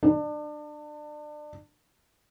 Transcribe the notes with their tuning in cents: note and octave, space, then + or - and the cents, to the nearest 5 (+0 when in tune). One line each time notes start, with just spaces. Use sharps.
D4 +30